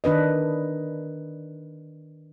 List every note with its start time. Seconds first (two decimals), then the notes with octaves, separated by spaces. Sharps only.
0.04 D#3 D4 B4 D#5